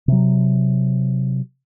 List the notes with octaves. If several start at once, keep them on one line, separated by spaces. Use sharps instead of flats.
C3 F#3